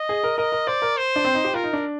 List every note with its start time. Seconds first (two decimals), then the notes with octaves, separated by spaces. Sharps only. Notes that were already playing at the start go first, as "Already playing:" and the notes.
Already playing: D#5
0.09 G#4
0.24 A#4
0.38 A#4 D#5
0.52 A#4
0.67 C5 D5
0.82 A#4
0.97 C5
1.16 D4
1.25 C4
1.35 D#4
1.44 G4
1.54 F4 A#4
1.64 D#4
1.73 D4